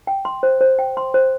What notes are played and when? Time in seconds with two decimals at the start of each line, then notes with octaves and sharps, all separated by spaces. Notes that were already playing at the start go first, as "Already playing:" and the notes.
0.07 G5
0.25 C6
0.43 C5
0.61 C5
0.79 G5
0.97 C6
1.14 C5